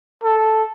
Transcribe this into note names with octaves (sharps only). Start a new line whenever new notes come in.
A4